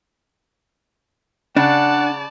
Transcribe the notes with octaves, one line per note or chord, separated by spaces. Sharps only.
C#3 D4 D5 F#5 A5